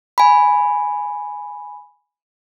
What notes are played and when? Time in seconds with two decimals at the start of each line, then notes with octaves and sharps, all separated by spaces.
0.18 G#5 B5